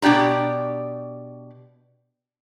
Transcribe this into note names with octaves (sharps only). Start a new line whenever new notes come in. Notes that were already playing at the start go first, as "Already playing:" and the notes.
B2 D4 G4 D5 A#5